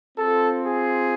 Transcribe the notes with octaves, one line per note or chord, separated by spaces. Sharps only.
C4 F4 A4
G#4